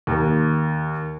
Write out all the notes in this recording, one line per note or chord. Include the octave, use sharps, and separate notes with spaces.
D#2